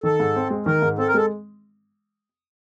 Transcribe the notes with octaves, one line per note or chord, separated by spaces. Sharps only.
D#3 A4
G#2
C4
G#3
D#3 A#4
G#2
C4 A4
A#4
G#3 A4